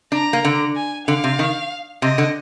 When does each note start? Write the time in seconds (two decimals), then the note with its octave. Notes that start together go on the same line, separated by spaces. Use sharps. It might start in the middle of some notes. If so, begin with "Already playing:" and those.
0.12 D4 A#5
0.33 A#3
0.45 D3
0.76 G#5
1.07 D3 F5
1.24 C3
1.39 D#3
2.02 C3 D#5
2.18 D3